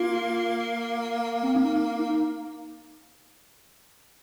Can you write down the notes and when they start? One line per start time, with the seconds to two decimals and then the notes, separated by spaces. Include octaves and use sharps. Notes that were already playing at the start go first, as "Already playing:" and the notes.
Already playing: A#3 F4
1.43 C4
1.55 D#4
1.99 D#4